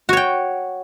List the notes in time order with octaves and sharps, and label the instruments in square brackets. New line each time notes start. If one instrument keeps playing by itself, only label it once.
[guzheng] F#4
C#5
G5